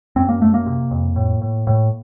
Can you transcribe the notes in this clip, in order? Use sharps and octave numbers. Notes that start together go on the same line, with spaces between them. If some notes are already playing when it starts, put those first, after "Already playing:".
F#2 C4
A#3
F#2 A3
A#3
C3
F2
A2
A2
A2